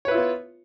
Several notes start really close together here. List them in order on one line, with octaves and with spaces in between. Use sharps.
C#5 B4 E4 F4 B3